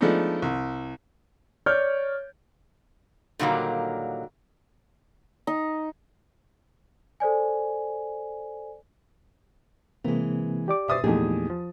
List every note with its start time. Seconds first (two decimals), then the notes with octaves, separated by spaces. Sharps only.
0.01 F3 G#3 A3 B3 D4 D#4
0.42 C2
1.66 C#5 D5 F6 G6
3.39 A#2 D3 D#3 F#3 G3 A#3
5.47 D#4
7.20 A4 C5 D5 G#5
10.04 C3 E3 G#3 A#3 C4
10.68 G4 D5 D6
10.88 B2 C5 E5 D#6 A6
11.04 E2 A#2 F3 A3 D#4 G4 G#4
11.50 F3